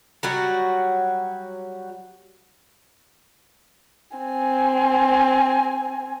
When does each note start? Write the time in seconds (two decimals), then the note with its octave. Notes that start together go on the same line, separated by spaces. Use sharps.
0.23 F#3 G3 F#4
4.17 C4 G#5